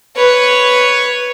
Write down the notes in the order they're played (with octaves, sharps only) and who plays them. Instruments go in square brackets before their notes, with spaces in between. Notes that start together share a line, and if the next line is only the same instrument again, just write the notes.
[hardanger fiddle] B4 C#5